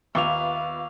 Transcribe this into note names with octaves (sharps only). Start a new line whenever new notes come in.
D#2 B3 F4 E5 F5 C#6 D6 F7